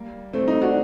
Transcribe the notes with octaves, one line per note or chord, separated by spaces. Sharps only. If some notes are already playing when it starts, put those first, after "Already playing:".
Already playing: G3 A#3
A3 C4
C4 D#4
D4 F#4